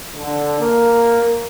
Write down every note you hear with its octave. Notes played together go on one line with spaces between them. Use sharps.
D3
A#3